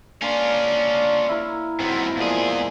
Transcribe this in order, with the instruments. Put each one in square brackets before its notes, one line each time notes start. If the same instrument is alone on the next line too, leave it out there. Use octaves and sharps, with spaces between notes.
[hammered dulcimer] A#3 [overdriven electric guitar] C#4 F4 [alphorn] D4
[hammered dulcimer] E4 A#4
[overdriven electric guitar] G#2 B3 [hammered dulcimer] F#3 C4
[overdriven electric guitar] E2 G#4 [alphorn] A#2 [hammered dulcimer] F3 G#3